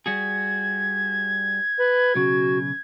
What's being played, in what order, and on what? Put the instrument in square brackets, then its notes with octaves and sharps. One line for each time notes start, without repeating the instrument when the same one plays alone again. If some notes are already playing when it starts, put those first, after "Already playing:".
[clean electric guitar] G3 F#4 G#4 [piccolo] G#6
[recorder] B4
[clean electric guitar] B1 C#3 [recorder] F#4